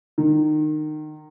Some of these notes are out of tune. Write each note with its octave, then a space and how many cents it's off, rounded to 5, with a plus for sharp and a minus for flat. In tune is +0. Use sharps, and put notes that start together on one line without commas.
D#3 -25